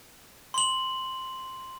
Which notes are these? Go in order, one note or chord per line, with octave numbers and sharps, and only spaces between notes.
C6 F#7